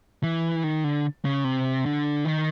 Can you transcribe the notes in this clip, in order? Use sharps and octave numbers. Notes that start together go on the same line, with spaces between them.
E3
D#3
D3
C#3
C3
D3
D#3